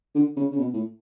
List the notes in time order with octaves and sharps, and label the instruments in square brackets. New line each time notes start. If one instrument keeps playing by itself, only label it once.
[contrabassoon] D3
C#3
C#3
B2
A2